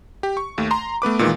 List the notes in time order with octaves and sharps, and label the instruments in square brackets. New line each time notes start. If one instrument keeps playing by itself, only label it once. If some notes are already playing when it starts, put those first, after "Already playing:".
[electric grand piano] G4
C#6
D#2 A3
A#5 C6
A3 B3 B4 D6
A#2 D#3 E3 G#3